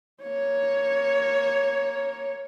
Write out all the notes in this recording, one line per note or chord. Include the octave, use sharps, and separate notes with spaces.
A#3 C#5